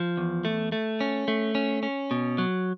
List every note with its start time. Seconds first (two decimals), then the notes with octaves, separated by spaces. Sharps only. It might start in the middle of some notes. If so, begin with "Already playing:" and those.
Already playing: F3
0.17 E2
0.45 A3
0.72 A3
1.01 C#4
1.28 A3
1.55 C#4
1.83 C#4
2.11 B2
2.38 F#3